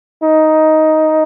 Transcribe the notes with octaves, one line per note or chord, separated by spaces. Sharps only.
D#4